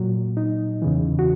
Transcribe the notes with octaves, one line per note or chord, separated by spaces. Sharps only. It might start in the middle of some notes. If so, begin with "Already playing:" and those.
Already playing: A#2 F#3
D#4
E2 C#3 E3
F#4